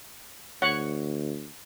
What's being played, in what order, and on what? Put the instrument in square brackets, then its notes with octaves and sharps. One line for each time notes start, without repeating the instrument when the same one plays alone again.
[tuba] D2 [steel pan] C#5 F#5